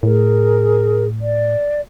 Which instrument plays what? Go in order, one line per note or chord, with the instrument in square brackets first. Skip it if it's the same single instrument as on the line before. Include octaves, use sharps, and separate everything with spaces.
[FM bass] A2 [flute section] G#4 A#4
[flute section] D5